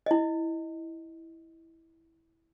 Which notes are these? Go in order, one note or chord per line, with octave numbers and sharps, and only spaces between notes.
E4 D#5